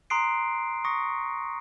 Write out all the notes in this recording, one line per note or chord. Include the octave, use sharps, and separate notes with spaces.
A#5 C6 D#6 F#6 C7 D7
C#6 D#6 A#6 C#7